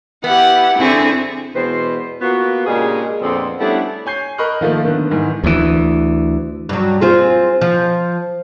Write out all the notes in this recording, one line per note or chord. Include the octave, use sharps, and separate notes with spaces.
B3 E4 G4 F#5
D3 C4 E4 G#4 C#6
E2 B2 G#3 B4 C5
A#3 B3 F4 F#4
A#2 C#3 G#3 D4 G4 G#4
F2 A#2 D3 B3 C4
G3 A3 B3 C#4 D4 E4
C#5 G#5 G6 C7
A#4 D#5 B5 C#6 F6 F#6
D#3 F3 A3 A#3
D3 D#3 B3
G#2 D#3 E3
D2 E3
G2 F#3
C4 F4 G#4
F3